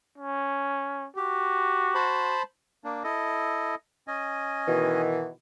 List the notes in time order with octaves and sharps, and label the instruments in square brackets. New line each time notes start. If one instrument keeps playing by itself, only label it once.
[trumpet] C#4
[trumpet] F#4 [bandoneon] G4
[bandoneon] C5 A5 B5
[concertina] A#3 D4
E4 A4 D#5
C#4 D#5 G#5
[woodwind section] B2 D#3 E3